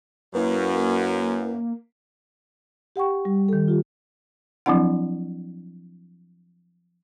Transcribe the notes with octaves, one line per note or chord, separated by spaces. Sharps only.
F#2 F#3 A#3 E4 B4
G4 F#5 G5 C#6
G3
D#3 A4
F4 G4
F3 F#3 C4 D4 E4 F#5